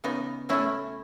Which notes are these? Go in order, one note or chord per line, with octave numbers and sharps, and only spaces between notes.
C#3 B3 D#4
F#3 A3 C#4 E4